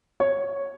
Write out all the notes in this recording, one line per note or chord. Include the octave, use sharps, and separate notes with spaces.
C#5